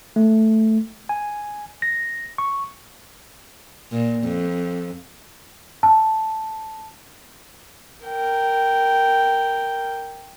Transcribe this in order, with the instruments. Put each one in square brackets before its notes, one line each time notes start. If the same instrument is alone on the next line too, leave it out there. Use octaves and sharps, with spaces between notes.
[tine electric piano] A3
G#5
A#6
C#6
[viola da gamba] A#2
F2
[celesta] A5
[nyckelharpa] A#4 G5